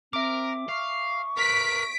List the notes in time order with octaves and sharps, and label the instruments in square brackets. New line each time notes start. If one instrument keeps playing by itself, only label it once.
[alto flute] C4 [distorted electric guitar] A#4 [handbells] E5 D6
[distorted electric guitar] F5 [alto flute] C#6
[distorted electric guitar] A#4 B4 [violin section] B6 D7